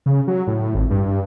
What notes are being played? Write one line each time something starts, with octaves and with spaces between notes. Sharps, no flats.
C#3
F#3
A2
G#1
G2